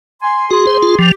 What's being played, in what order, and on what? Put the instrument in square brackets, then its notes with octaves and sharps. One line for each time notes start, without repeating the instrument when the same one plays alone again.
[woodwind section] G#5 C6
[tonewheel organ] F#4 [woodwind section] G#4 C6
[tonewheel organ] C5
F4
[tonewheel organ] F3 [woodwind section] G4